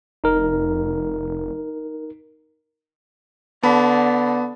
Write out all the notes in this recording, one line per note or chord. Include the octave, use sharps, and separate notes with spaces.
F1 D#4 A#4
D3 B3 A5 B5